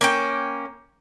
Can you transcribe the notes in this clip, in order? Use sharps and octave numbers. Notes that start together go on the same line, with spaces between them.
A#3 C#4 G5